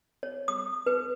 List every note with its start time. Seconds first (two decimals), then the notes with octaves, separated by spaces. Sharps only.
0.23 C#5
0.48 D#6
0.86 B4